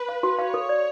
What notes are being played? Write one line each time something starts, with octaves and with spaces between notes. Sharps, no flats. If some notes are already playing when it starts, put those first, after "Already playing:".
Already playing: B4
F5
F#4
C#5 F5
A4
D5